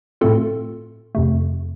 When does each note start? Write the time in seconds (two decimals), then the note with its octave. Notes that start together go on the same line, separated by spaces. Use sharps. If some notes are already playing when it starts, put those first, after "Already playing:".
0.21 A2 A3 C4 F4 A4
1.15 F2 C3 A3